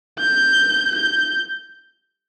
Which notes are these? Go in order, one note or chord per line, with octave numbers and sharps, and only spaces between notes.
G6
G6